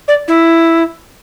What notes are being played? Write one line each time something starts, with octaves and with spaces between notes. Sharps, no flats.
D5
E4